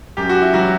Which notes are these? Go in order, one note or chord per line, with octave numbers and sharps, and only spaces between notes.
F#2 G4
F#4
E4
E3 F#3 F#4